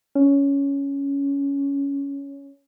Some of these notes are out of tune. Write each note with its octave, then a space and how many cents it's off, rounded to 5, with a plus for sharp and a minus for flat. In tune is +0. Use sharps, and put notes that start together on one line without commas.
C#4 +10